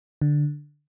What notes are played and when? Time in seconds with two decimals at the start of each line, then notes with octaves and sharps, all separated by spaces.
0.22 D3